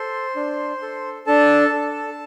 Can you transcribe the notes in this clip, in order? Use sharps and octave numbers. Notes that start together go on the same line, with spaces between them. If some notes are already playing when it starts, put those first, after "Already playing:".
Already playing: A4 C5 C6
D4
A4
D4 A4 A5
A4